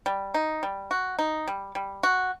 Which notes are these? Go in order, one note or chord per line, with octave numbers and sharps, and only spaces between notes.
G3
D#4
G3
F#4
D#4
G3
G3
F#4